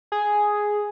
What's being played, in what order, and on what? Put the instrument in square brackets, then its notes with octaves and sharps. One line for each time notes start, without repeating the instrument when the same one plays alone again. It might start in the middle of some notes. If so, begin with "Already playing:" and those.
[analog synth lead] G#4